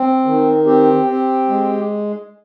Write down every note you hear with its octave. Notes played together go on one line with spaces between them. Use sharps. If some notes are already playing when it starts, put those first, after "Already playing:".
Already playing: C4
D#3
C4 G4
C4
G#3